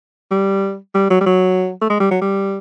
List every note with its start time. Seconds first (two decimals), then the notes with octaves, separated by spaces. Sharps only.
0.31 G3
0.94 G3
1.10 F#3
1.21 G3
1.26 F#3
1.81 A3
1.90 G#3
2.00 G3
2.11 F#3
2.21 G3